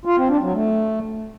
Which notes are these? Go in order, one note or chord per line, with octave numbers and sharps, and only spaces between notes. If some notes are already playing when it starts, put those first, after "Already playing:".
F4
C4
D4
F#3
A3